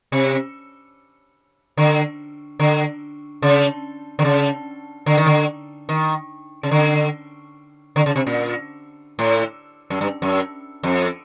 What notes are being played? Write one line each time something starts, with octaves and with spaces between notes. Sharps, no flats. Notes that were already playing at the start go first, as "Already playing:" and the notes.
C3
D3
D3
C#3
D3
C#3
D3
D#3
D3
D#3
C#3
D3
D3
C#3
C3
A#2
A2
F#2
G2
F#2
F2